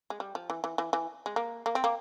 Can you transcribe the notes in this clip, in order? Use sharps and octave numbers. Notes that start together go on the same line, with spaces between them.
G#3
G3
F3
E3
E3
E3
E3
G#3
A#3
A#3
C4
A#3